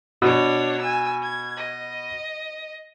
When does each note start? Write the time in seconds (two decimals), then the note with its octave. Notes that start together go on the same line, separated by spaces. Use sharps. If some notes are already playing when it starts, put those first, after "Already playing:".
0.22 B2 D4 C#5
0.81 G#5 E6
1.23 G#6
1.57 D#5